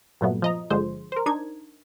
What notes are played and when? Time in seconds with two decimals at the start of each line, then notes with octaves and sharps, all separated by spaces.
0.21 G2 A#2 F#3 A3 B3
0.42 F3 D#5 A#5
0.70 G1 D3 F3 G#3 C5
1.12 A#4 C5
1.26 D4 D#4 G#6